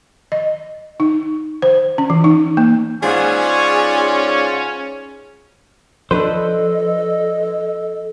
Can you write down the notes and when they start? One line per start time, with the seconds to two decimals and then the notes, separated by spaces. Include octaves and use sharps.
0.32 D#5
1.00 D#4
1.62 C5
1.98 C#4
2.10 E3
2.24 D#4
2.57 A#3
3.03 G#2 C#4 F4 G#4 D5
6.11 F3 D4 A4 B4 C5 D#5